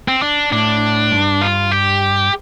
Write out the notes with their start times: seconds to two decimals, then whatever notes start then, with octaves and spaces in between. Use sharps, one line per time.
0.08 C4
0.22 D4
0.52 A2 D4
1.12 G2
1.41 F4
1.71 G4